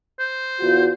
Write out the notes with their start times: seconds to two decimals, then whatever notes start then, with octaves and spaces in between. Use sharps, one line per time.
0.19 C5
0.60 E2 F4 F#4